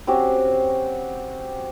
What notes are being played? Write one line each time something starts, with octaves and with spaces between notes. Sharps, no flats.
C4 C#4 F#4 G4